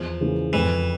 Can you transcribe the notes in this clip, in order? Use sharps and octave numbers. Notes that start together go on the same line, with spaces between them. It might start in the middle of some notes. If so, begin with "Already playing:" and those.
Already playing: E2 F3
C#3 E3 A#3
F2 E3